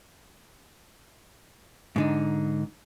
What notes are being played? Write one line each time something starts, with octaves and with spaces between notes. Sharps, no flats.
G#2 D3 D#4